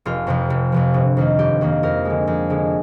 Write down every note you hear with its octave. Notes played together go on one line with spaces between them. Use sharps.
F1 F4
F2 C3 F3
F1
F2 C3 F3
G1
F2 D#3 A#3
G1 G4
F2 D#3 A#3
F2 A#4
D3 G#3
F2
D3 G#3